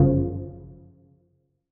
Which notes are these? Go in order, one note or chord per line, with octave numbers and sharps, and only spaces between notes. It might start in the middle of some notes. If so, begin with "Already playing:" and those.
Already playing: G1 F#2 C#3 F3